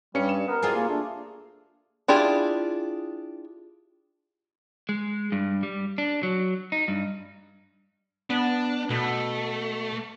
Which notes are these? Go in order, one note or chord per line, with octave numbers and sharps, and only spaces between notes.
G2 G3 C#4 C#7
E7
B3 A#4
C2 F4 G4 G#4
A#3
A3 D4
D4 E4 F4 G4 G#4
G#3
G2
G3
D4
F#3
D#4
G2
B3 D4
B2 A3